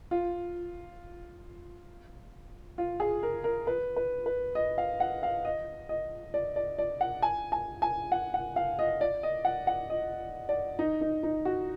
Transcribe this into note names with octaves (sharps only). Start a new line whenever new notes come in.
F4
F4
G#4
A#4
A#4
B4
B4
B4
D#5
F5
F#5
F5
D#5
D#5
D5
D5
D5
F#5
G#5
G#5
G#5
F#5
F#5
F5
D#5
D5
D#5
F#5
F#5
D#5
D5
D#4
D#4
D#4
F#4